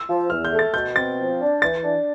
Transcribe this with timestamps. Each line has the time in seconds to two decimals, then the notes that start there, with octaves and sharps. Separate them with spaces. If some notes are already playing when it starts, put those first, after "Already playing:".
Already playing: E6
0.08 F3
0.29 E2 F6
0.45 G6
0.52 A3
0.59 A6
0.74 B2 G6
0.95 C4 A6
1.18 F3
1.40 D4
1.62 E3 A6
1.83 D4